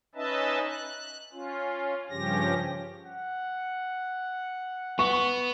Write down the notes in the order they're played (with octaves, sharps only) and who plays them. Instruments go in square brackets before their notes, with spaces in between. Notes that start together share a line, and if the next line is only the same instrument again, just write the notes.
[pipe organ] C#4 D#4 B4 D#5 E5 A5
F#6
C#4 F4
G2 C#3 F3 C#4 G4 A#6
[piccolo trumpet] F#5
[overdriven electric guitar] B3 [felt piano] C#6